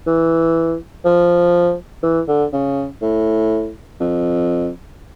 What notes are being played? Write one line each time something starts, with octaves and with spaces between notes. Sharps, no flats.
E3
F3
E3
D3
C#3
A2
F2